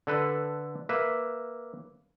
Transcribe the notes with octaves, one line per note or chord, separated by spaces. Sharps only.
D3 A4 B4
A#3 B4 E5